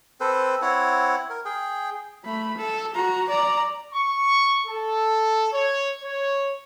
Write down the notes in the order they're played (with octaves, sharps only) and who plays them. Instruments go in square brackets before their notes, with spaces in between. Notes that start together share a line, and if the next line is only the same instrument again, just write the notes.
[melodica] C4 A4 B4 C5
C4 E4 C#5 F#5
A#4
G#4 G5
[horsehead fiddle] A3 B5
A4
F#4 A#5
D5 A#5
[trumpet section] C#6
A4
C#5
C#5